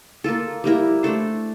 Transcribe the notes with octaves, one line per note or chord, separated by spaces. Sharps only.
A#3 F4 A4
G3 A#3 E4 A#4
A3 D4 A4 C5